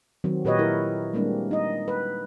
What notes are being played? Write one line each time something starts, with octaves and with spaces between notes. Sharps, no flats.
D#3 F#3 C4
A#2 G4 B4 C#5 D#5
E4 A#4
G3 G#3 A#3 C4 D4
D#4 D#5
B4